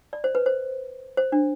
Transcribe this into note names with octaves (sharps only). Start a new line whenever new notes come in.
D5
C5
B4
C5
C5
D4